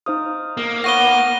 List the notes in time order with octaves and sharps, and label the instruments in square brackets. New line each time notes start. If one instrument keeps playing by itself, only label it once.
[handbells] D#4 C5 D#6 [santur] F5
[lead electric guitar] A#3
[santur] B3 C#5 F5 [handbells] F#5 [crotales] A#6 D#7 G7